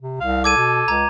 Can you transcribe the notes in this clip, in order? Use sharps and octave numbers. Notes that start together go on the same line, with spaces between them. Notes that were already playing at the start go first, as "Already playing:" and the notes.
C3
C2 F5
A4 D6 G#6 D#7
B2
C#2 A#5 G#6